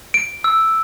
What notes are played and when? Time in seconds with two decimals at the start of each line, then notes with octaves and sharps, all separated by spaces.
0.14 D7
0.44 E6